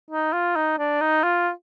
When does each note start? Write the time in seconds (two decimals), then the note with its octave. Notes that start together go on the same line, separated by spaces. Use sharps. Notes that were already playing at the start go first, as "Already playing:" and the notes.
0.11 D#4
0.33 F4
0.56 D#4
0.78 D4
1.01 D#4
1.23 F4